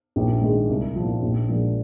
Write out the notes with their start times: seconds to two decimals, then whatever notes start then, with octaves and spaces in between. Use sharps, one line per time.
0.16 A#1
0.41 G#2 D#3 G#3
0.69 C2
0.96 A#2 F3
1.22 A#1
1.49 A#2 F3 G#3